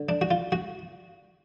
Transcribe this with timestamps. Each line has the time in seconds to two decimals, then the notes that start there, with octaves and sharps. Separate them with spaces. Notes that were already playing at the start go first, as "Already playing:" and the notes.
Already playing: D3
0.09 D4
0.21 F#4
0.31 F4
0.52 F#4